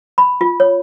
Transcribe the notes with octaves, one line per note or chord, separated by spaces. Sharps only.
B5
F4
C#5